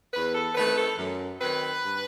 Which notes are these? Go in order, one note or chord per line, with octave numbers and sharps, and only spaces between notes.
E2 B4
A4
D#3 A3 C4 B4
A4
F#2
D#3 F#3 C4 B4
G2